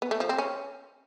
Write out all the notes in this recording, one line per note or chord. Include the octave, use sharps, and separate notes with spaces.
B3
A3
F3
C4
C#4